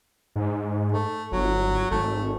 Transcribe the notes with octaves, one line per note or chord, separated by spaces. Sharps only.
G#2
A3
G1 F#3
G#1 A3